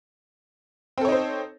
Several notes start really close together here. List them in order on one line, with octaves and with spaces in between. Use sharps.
C4 A4 C#5 D#4 C5